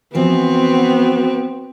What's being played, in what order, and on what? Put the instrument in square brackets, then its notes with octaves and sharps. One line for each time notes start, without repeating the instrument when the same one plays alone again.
[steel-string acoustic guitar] E3 F3 [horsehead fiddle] B3 [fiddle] C4 [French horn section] F#4